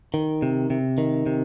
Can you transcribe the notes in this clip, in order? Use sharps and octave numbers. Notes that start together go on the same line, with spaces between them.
D#3
C3
C3
D#3
C3